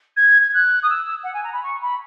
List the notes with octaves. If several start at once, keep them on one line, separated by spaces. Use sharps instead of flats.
G#6
G#6
F#6
D#6
E6
F#5
G#5
A#5
B5
C#6
B5